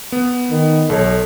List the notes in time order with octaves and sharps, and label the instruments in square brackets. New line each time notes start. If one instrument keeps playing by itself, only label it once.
[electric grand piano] B3
[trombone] D#3
[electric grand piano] B1 C#5 [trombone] A4